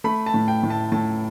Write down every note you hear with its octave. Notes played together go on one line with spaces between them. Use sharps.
A3 B5
A5
A2
G5
A2
A5
A2 A5